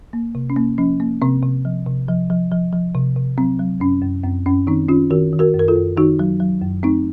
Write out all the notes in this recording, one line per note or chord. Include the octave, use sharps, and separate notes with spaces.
A#3
C3
C#4
A#3
F3 C#4
A#3
C3 C4
C3
F3
C3
F3
F3
F3
F3
C3
C3
F#3 C4
F#3
F#2 C#4
F#2
F#2 C4
F#2 C#4
D#3 C4 D#4
D#3 C#4 F4
D#3 F#4 A#4
D#3
F#4 A#4
F#2
A#4
F4 A4
F#2
D#3 D#4 F#4
F#3
F#3
F#2
A3 C4 D#4